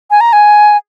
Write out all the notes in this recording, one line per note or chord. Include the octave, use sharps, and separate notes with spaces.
G#5
A#5
G#5